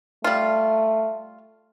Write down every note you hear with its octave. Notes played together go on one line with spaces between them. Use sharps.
G3 A3 F4